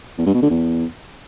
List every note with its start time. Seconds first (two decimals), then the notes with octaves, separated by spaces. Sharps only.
0.18 E2
0.26 G2
0.34 B2
0.42 D3
0.50 E2